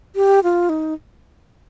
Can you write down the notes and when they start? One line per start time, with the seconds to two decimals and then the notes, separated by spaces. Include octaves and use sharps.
0.16 G4
0.43 F4
0.69 D#4